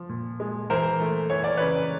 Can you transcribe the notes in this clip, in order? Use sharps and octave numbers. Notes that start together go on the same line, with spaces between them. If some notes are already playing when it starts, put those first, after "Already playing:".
Already playing: F3
A#2
G#3
E3 A#4 C5
A3
E3 C#5
D5
C#3 B4 C#5